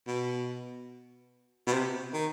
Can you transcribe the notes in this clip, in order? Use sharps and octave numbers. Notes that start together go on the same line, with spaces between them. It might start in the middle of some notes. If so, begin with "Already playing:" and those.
B2
B2
C3
D#3